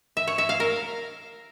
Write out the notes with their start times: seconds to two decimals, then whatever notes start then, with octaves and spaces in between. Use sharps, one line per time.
0.17 E5
0.27 C#5
0.38 E5
0.49 F5
0.60 A#4